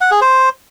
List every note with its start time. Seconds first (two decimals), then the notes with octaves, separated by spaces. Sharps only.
0.01 F#5
0.11 G#4
0.21 C5